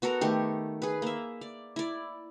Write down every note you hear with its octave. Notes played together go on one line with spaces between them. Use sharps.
B3 F#4 A4 A#4
D#3 A3 G4
G#4 B4
A#3 E5
D5
E4 D5